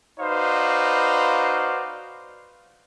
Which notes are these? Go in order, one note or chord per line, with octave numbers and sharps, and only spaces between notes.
D#4 F#4 B4 C5 D5 F5